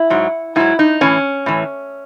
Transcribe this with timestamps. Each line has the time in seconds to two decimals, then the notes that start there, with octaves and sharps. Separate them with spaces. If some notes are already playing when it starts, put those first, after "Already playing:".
Already playing: E4
0.10 G#2 F#3
0.56 G#2 F#3 E4
0.79 D#4
1.01 A2 E3 C#4
1.46 A2 E3